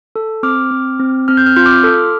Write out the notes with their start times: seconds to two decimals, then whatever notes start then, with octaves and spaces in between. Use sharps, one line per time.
0.16 A4
0.43 C4 D6 F6
0.71 C4
1.00 C4
1.28 C4 F6
1.37 G6
1.46 F6
1.56 F4 G6
1.65 D6 F6
1.84 A4